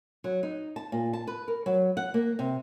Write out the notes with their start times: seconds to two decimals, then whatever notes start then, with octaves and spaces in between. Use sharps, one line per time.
0.24 F#3
0.43 D#4
0.76 A5
0.92 A#2
1.13 A5
1.27 B4
1.48 A#4
1.66 F#3
1.97 F#5
2.14 A#3
2.39 C3